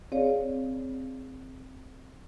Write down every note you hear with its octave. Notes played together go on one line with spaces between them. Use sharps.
C4 G#4 C#5 D5 F5